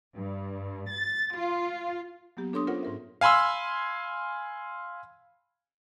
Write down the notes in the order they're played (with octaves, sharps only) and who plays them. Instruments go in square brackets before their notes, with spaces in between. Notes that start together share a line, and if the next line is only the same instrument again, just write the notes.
[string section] G2
A6
F4
[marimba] F#3 A#3 B3 G4
D4 A4 C#5 C6 D6 D#6
C#4 F4 A#4 C5 C#5 F#5
G#2 A#4 E5
[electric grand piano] F5 G#5 B5 C6 E6